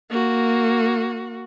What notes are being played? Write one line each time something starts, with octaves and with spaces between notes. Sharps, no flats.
A#3 F#4